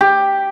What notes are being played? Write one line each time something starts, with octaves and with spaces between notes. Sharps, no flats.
G4